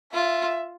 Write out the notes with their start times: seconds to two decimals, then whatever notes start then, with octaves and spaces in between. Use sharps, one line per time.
0.13 F4 E5